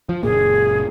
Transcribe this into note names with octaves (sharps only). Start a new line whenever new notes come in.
F3
F#1 A#2 A#3 G#4